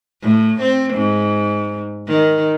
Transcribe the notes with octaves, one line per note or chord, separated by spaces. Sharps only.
A2
C4
G#2
D#3